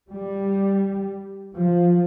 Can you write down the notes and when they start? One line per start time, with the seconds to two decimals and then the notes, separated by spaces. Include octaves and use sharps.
0.12 G3
1.54 F3